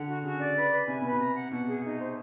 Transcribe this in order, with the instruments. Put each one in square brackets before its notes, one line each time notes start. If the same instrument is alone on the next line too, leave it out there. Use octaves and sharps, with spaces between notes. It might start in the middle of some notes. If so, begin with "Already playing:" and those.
Already playing: [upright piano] D3 [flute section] F#5
[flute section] F#4
[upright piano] C#3 [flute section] F#4
[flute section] D5
B4
B4
[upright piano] C3 [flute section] G#5
[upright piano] B2 [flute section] B4
[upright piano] C3
[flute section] A#5
F#5
[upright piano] B2 [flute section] F#5
[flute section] G#4
D#4
C5